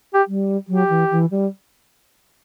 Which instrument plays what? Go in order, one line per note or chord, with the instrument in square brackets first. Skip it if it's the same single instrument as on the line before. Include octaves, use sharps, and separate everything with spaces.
[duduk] G4
[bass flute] G3
[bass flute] F#3 [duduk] G4
[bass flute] E3
E3
G3